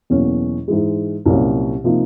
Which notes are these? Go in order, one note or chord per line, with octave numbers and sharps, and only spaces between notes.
E2 B2 F#3 A#3 C#4
G#2 E3 G#3
C2 A#2 F#3 A#3 C#4
C3 F3 A#3 D#4